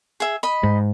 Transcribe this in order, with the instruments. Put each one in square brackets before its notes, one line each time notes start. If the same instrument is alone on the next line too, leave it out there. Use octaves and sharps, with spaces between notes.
[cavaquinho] G#4 E5
D#5 B5
[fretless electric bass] G#2